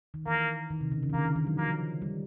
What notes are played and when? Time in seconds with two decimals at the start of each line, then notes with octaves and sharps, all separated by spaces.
0.14 D#3
0.26 E3 A#3
0.70 D#3
0.81 C3
0.92 C#3
1.03 D3
1.09 E3
1.13 D#3 A#3
1.25 D#3
1.36 D#3
1.47 F#3
1.58 F3 A#3
2.02 G3